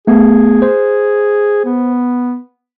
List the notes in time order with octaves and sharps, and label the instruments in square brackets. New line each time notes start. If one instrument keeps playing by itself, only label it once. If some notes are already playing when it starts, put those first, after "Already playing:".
[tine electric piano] A3 B3 [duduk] G#4
[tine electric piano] C5
[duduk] B3